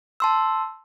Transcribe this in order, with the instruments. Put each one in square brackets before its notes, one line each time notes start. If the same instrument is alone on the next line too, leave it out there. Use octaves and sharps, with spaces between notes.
[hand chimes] A5 C6 E6